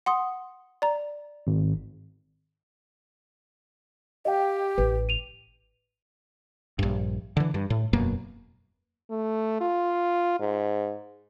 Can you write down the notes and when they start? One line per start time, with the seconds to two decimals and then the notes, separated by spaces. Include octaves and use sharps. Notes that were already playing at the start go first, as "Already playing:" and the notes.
0.06 F#5 C6 D#6
0.82 D5 A#5
1.47 G#1
4.25 G4 D#5 F5 G5
4.78 A1 B4
5.09 D#7 F7
6.79 A#1 G2
7.37 D3 E3
7.54 G2
7.70 A2
7.93 E1 F#2 B2 A#3
9.11 A3
9.60 F4
10.39 G#2